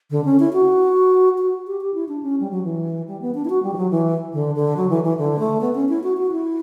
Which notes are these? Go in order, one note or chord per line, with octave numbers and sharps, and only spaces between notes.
D3
C#4
E4
F#4
F#4
G4
G4
E4
D4
C#4
G3
F#3
E3
G3
B3
D4
E4
F#4
G3
E3
F#3
E3
D3
D3
F#3
E3
E3
D3
A3
B3
C#4
E4
F#4
F#4
E4